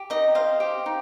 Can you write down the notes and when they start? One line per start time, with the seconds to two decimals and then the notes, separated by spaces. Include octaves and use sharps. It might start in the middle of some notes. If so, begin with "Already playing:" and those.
Already playing: G4
0.10 D#4 D#5
0.35 C5 F5
0.60 G4
0.86 D#4